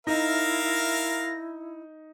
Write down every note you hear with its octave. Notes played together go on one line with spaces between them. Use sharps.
D#4 E4 A#4 E5 F5 A#6